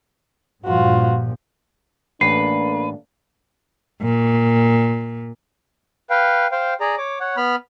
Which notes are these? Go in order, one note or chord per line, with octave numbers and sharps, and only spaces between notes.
G2 A#2 F3 F4 F#4
A1 A3 A#3 D4 B4 C7
A#2
B4 F5 G5
C5 F5 G5
G#4 D5 A#5
C#5 D6
C#5 F#5
B3 B5 F6